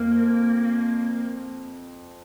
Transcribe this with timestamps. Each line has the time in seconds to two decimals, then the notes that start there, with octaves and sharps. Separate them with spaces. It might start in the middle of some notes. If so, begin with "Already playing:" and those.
Already playing: F2 F3 A#3